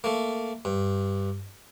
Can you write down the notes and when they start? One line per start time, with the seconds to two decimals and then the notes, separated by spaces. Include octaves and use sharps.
0.04 A3 A#3
0.65 G2